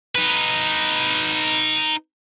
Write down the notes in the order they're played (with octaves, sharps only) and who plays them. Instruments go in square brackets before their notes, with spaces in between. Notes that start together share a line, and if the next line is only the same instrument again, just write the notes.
[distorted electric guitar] D#4 B4